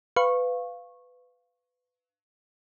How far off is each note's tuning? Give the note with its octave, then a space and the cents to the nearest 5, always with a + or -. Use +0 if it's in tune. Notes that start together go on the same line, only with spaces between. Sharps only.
B4 +20 F5 +0 C#6 -15